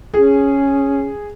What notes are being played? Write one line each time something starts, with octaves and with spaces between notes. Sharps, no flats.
C#4 G#4